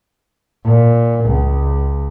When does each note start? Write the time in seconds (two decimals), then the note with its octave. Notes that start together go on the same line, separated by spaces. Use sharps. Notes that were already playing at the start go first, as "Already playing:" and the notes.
0.64 A#2
1.26 C#2